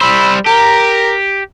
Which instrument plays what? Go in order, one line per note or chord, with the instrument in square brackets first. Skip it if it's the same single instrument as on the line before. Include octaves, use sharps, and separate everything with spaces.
[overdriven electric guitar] G3 C5 [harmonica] B5 E6
[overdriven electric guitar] G4 [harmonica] A#4 A#5